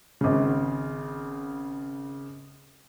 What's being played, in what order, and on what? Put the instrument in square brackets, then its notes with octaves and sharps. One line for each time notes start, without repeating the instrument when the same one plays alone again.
[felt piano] G#1 C#3